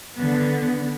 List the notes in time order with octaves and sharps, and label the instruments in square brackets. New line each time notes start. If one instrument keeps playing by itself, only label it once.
[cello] D3 B3